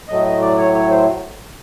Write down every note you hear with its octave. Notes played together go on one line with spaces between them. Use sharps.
A2 F#3 A3 D#5
D#5
D5
C#5
C#5
C5